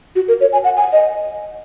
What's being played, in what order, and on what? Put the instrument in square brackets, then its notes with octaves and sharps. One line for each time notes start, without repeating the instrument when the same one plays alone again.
[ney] F#4
A#4
C#5
G#5
F#5
G#5
D#5